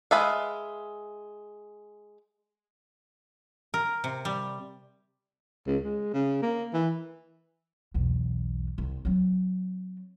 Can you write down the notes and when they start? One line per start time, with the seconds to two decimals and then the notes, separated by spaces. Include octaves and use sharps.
0.11 G#3 B4 E5 F5
3.74 A#4
4.04 C3
4.25 G3
5.67 C#2
5.83 G#3
6.14 C#3
6.42 A#3
6.74 E3
7.94 B1 E2
8.78 C2
9.05 F#3 C4